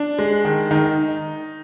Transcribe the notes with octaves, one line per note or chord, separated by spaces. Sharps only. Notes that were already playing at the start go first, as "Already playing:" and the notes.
Already playing: D4
G#3
D#3
D#3 D#4